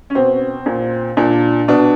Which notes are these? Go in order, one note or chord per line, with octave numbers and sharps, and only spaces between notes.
C#4
B2 C4
A#2
A#2 D4
B2 D4